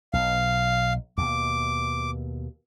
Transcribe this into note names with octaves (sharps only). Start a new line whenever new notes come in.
B1 F5
D#2 B2 D6